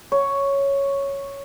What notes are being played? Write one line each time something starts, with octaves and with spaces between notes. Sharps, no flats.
C#5